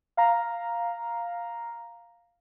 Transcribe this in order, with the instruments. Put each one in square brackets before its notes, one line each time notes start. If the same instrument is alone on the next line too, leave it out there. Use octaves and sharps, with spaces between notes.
[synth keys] F5 A#5